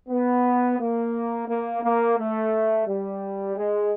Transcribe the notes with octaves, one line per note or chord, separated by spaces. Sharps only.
B3
A#3
A#3
A#3
A3
G3
G#3